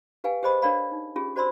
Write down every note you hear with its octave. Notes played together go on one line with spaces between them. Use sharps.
G4 B4 F5 G5 G#5
G4 G#4 C5 D#5 B5 D#6
D4 A#4 C#5 D5 F5 B5
D#4
C#4 F4 G4 G#4
F#4 C5 D5 B5 C6 E6